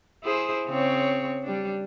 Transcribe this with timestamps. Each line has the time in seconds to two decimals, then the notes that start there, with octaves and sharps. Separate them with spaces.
0.24 E4 G#4 C5
0.67 C#3 C4 C#5
1.44 G3 D4